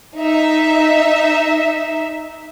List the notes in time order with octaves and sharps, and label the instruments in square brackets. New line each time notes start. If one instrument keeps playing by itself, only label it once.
[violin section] D#4 E5